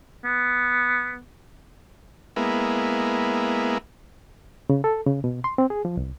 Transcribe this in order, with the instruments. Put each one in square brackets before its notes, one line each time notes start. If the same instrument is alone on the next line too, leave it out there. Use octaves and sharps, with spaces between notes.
[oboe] B3
[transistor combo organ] G#3 A#3 B3 E4
[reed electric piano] C#3
A4
C#3
B2
C6
C4
G#4
F3
C2